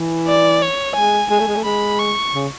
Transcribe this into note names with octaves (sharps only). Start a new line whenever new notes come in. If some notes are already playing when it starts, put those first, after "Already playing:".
Already playing: E3
D5
C#5
G#3 G#5
G#3 G#5
A3
G#3
A3
G#3 B5
C#6
C#3